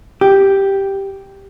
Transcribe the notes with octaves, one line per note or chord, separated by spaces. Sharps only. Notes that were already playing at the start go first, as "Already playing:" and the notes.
G4